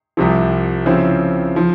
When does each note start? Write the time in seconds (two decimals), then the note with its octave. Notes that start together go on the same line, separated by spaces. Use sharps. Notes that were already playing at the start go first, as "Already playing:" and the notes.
0.17 C2 C3 F3
0.86 C#3 F3 C4 E4
1.56 F3